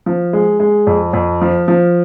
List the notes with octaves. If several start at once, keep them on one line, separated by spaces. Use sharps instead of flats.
F3
G#3
G#3
F2
F2
F3
F3